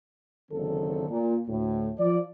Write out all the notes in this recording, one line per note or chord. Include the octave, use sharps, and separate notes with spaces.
F#1 D3 D#3 C4 A4
A#2
D2 A2
F3 D5